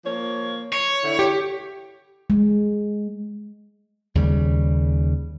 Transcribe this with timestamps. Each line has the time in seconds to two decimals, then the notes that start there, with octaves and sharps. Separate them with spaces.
0.05 F3 A#3 C#5
0.73 C#5
1.03 D3 E4
1.19 G4
2.30 G#3
4.15 D#2 C#3 G3